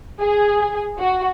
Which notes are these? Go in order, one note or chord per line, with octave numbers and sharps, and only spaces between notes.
G#4
F#4